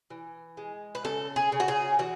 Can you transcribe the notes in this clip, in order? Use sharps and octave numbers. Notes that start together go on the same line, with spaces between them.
E3
G#3
B4
C#3 A4
G#4
C#3
F#4
G#4
E3 F#4